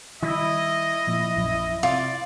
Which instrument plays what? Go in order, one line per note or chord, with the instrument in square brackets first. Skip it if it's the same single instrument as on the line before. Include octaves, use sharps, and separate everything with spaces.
[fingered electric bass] D#3 G3 [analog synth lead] E4 [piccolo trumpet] D#5
[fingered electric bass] A#2 F3
A#1 F#2
[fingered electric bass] C3 [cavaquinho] F4 [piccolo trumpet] D5